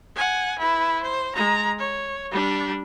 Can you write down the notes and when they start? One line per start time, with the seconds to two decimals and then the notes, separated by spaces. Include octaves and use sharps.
0.16 F#5 G#5
0.58 E4 B4
1.02 C5
1.35 G#3 A#5
1.79 C#5
2.31 G3 D4